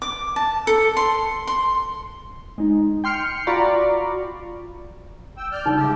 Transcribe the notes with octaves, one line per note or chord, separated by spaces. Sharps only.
D6
A5
A4
C6
C6
G#3 D#4
G5 C6 F6 C7 C#7
F4 F#4 D5 A#5 B5 C#6
G5 E6
D5 F6 G6
C#3 G3 D#4 F4
G#3 G4 E5 D6 E6